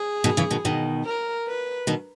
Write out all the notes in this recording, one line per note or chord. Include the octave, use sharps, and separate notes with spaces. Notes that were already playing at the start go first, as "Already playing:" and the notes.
Already playing: G#4
B2 D#3
C#3 E3
B2 D#3
B2 D#3
A#4
B4
B2 D#3